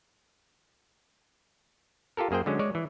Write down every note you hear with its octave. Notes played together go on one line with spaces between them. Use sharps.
F4 G4 A4 A#4
F#2 A#3 G#4 C5 G5
D3 F#3 G#3 C#4
G#3 C#5 D5
E3